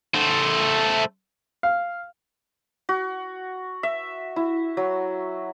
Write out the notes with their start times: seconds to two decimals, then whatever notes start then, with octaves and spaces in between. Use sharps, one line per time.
0.15 A3 C5
1.63 F5
2.89 F#4
3.83 E5
4.36 E4
4.77 F#3